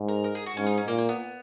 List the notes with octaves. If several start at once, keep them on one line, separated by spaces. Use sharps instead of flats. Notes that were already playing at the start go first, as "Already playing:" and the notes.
Already playing: G#2
A#4
A#4
G#4
F#4
G#2 C#4
D#4
C#4
A#2 A#3
A#3
B3